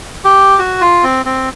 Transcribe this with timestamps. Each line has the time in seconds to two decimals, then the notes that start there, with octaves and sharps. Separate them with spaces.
0.25 G4
0.59 F#4
0.81 F4
1.03 C4
1.26 C4